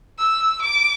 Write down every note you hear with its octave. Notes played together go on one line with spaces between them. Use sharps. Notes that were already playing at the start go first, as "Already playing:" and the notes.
E6
D6